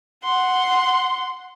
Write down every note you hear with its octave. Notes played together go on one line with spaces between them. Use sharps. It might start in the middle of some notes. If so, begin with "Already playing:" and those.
F#5 C6